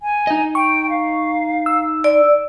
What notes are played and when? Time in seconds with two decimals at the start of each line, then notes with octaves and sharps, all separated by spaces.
0.02 G#5
0.27 D#4 D#5
0.55 G5 C#6
0.90 F5
1.66 E6
2.04 D5